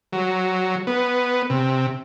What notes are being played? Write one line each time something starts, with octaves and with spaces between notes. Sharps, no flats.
F#3
B3
C3